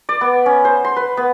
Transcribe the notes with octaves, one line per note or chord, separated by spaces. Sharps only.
D5
B3
C#4
C5
C6
B4
B3